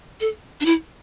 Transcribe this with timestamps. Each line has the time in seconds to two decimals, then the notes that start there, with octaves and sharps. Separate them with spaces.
0.21 A4
0.61 D4
0.66 E4